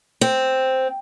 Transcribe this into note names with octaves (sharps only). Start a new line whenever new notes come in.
C4